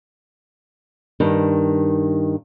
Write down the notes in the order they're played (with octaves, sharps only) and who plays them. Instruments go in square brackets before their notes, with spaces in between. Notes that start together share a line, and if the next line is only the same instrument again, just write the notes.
[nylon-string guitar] G2 D#3